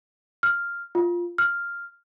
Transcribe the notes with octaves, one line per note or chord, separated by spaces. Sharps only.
F6
F4
F6